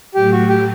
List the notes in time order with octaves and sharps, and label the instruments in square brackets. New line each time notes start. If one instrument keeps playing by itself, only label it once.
[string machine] A2 F#3 A3 [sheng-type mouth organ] G4
[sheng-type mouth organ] F#4
G4